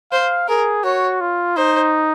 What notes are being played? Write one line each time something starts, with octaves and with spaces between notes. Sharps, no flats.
C5 F5
G#4 A#4
F#4 C#5
F4
D#4 C5